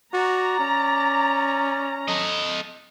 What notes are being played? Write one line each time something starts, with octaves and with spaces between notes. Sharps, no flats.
F#4 D5 A#5
C#4
A4 D#5